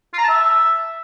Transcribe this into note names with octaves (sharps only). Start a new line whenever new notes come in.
F4
A#5
A5
E5